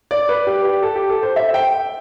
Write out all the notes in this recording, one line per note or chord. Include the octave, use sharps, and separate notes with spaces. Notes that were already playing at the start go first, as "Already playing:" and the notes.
D5
B4
G4
G4
A4
G4
A4
C5
E5
G5